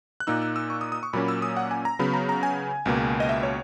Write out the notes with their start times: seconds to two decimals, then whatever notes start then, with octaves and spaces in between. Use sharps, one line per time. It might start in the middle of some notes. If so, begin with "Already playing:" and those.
0.20 F#6
0.27 A#2 A#3 D#4 E6
0.42 E6
0.56 E6
0.70 C#6
0.81 D#6
0.92 D#6
1.03 C#6
1.13 A#2 F#3 A#3 C#4 B5
1.28 E6
1.42 D#6
1.56 F#5
1.71 G#5
1.85 A#5
1.99 C#3 F#3 B3 B5
2.14 A#5
2.29 A#5
2.43 G#5
2.86 C#2 B2 A#3
3.20 D#5
3.29 E5
3.43 C#5